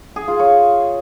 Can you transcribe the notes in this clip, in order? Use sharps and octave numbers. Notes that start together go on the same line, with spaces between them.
G#4
F4
C#5